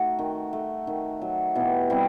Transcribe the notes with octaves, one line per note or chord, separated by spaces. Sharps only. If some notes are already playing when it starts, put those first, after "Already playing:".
Already playing: A3 D#4 F#4
D#3
A3
D#3
F#3
B2 E4 G4
G3 C4 E4